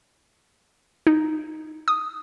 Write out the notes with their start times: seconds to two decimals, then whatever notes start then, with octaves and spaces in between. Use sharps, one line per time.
1.07 D#4
1.88 D#6